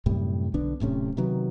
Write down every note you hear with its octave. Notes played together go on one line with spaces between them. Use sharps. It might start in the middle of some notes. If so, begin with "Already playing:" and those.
F#2 A2 C3 G3
B1 D3 B3 D4
D1 A2 C3 C#4
C3 D#3 F#3 B3